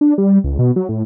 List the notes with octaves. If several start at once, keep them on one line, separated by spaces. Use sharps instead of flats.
D4
G3
C#2
B2
F#3
A2